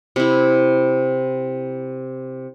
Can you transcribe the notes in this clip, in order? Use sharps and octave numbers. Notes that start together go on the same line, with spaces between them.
C3 E4